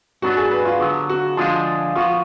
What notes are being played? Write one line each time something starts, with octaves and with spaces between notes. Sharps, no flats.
G#2 F#3 B3 D4 F#4
G#4
B4
F4
D3 F#3 B3
F#4
D3 F3 G#3 D4 F4 G#4
F3 B3 F4 F#4